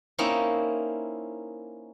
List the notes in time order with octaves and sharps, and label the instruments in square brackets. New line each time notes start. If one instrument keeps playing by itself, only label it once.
[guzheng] A#3 C4 C#4 D#4 E4